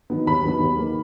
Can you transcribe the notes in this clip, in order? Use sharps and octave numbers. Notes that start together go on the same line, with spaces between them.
D#3 F#3 B3
D#2 B5
D#3 F#3 B3
D#2
D#3 A#3